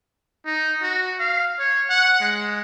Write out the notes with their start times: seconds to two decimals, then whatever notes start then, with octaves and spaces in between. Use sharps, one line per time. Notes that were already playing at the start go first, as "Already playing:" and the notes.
0.46 D#4
0.82 F#4
1.19 F5
1.59 C#5
1.89 F#5
2.20 G#3